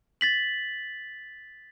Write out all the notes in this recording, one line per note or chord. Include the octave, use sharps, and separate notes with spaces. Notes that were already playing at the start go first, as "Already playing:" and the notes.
A6 B6 F#7